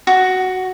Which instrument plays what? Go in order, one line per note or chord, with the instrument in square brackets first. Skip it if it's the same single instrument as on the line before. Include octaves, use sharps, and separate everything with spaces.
[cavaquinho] F#4